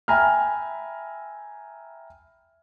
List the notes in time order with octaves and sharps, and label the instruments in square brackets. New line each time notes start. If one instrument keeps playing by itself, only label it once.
[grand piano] E5 G5 G#5 A#5 B5 F6